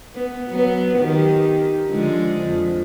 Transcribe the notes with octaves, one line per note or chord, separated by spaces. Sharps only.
B3
F#3 B3
D#3 G4
D3 F3 G#3
F2